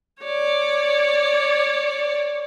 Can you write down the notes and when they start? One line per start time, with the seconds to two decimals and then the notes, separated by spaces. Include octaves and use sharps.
0.21 C#5 D5